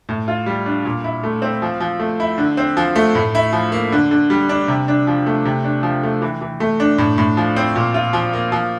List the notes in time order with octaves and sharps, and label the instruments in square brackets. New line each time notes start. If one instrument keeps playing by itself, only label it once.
[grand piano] A2
F4
G3
D4
A#2
E4
A3
C4
F3
F3
A3
E4
D3
C4
F3
A3
A2
E4
F3
A#3
D3
D3
G3
D4
C3
D4
F3
A3
C3
D4
F3
A3
E3
E3
A3
D4
A2
A2
F3
C4
A#2
F4
F3
A#3
F3